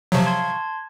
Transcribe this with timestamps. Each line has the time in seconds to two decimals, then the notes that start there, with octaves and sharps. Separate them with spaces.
0.12 C3 F3 F#3 F5 A5 C#6
0.26 A5 C6 G#6